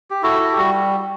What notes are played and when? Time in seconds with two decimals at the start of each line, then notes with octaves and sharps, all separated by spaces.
0.11 G4
0.23 E4 F#4 A4
0.40 E4
0.52 G4
0.57 G3 F#4